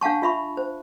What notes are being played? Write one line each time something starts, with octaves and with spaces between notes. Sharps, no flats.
D4 F5 F#5 A5 C#6
F4 E5 B5 C#6
C5